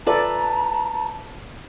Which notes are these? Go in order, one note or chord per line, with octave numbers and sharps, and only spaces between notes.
F4 A4 B4 D5 A5 A#5